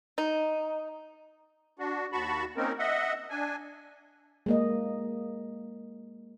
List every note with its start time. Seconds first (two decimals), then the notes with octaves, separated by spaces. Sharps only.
0.18 D#4
1.79 D4 F#4
2.12 D#2 F#4 A5 B5 C#6
2.57 A#3 C4 C#4 D#4 A#4
2.79 D#5 E5 F#5
3.30 D4 G#5
4.46 G#3 A#3 D#5